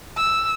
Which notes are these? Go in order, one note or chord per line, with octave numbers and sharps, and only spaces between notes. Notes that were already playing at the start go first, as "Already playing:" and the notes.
E6